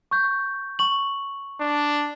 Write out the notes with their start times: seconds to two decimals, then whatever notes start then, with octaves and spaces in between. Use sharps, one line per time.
0.11 C#6 G6
0.79 C#6 F#7
1.61 D4